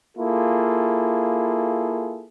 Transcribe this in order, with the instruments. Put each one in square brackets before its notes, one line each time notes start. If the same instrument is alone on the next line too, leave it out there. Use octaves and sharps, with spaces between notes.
[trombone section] A#3 E4 F4 G#4 A4